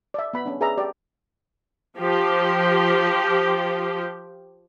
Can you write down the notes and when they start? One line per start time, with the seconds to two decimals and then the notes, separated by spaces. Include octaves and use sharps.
0.14 D5 E5
0.33 B3 B5
0.45 C#4 D4
0.61 G#4 B4 D5 E5 A#5
0.77 G4 D5
1.98 F3 G4